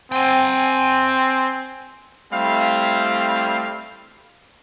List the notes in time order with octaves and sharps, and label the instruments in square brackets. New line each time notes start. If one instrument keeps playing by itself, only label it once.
[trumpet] C4 [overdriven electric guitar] G5 G#5
[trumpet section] G3 A3 C4 E4 F5